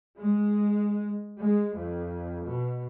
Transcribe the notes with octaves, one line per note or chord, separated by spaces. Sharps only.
G#3
G#3
F2
B2